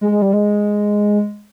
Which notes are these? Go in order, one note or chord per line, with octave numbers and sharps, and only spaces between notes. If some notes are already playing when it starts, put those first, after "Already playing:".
G#3
G#3
G3
G#3